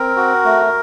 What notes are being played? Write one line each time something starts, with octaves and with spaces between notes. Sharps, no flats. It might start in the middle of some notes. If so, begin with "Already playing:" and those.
Already playing: C4 A#4
F#4
A3